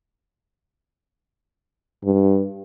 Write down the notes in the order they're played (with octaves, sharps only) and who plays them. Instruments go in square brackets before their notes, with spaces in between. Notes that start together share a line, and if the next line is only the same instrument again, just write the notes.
[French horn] G2